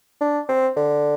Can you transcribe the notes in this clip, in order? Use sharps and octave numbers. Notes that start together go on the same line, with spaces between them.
D4
C4
D3